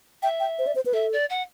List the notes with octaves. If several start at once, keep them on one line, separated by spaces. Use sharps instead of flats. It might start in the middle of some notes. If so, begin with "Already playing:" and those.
E5 G5
G5
C5
D5
C5
B4
A4 E5
D5
F#5